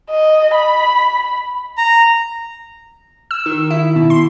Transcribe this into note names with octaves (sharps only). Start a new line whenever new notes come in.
D#5
B5
A#5
E6
D#3
E4
B2
C6